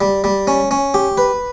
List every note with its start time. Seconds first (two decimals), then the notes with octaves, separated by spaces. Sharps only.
0.01 G3
0.24 G3
0.47 C#4
0.71 C#4
0.94 G4
1.18 B4